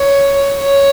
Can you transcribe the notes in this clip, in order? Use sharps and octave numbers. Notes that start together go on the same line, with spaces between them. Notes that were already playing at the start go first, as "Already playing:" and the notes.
Already playing: C#5
C#5